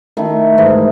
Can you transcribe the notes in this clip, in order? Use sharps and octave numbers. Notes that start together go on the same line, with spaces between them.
D#3 A3 E4
G#2 E3 A3 D#4